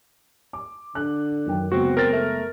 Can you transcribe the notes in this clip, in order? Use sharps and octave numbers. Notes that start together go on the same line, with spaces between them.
D6
D3 F#6
F#2 D#3 G5
F#1 G#3 B3 C4 F#4
C4 A#4 A6
A3